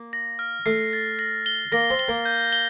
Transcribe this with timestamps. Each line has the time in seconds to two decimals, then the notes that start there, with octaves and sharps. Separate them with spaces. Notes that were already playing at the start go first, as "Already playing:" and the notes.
Already playing: A#3
0.13 A#6
0.39 F6
0.66 A3 A4 C7
0.93 A6
1.19 A#6
1.46 G7
1.72 A#3 A#4 A#6
1.90 C4 C5
1.99 G7
2.08 A#3 A#4
2.25 G6
2.53 G7